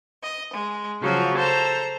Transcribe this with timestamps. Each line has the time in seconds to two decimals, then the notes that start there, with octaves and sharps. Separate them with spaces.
0.22 D#5
0.52 G#3
1.01 C#3 F3 F#3 F4 F#4
1.38 A4 C5 A5 A#5